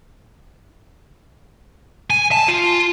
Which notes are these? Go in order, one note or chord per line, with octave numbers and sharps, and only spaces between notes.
G#5
A5
F4